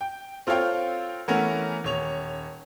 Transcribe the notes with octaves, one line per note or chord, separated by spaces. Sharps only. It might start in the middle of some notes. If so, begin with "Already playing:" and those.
G5
C4 F4 A4 C#5 F5 G5
E3 A3 B3 C#4 A#4
D#1 C#5 F7